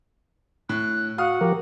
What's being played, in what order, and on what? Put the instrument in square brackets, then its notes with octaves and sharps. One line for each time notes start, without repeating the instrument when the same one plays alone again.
[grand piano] A2 [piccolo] F#6
[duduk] F#4 [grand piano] F5 D#6 F6 [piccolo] F#5
[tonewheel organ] F3 A#4 [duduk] G4